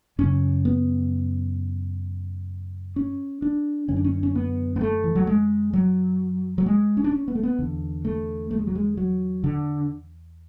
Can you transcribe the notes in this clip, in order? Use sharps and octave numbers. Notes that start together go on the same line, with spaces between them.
F#2 C#3 C#4
B3
C#4
D4
F#2 D3 C#4
D4
C#4
C#4
B3
B3
A3
E3
F#3
G#3
F#3
F#3
G#3
C#4
D4
C#4
B3
A3
B3
E2 D3
A3
A3
G#3
F#3
G#3
F#3
D3